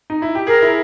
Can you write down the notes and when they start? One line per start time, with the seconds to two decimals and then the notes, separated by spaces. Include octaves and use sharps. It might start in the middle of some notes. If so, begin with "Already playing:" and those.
0.10 D#4
0.22 E4
0.35 G4
0.47 G#4 A#4
0.62 E4